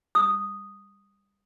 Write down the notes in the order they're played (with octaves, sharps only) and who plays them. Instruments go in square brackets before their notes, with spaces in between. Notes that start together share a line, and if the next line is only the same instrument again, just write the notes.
[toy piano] D#6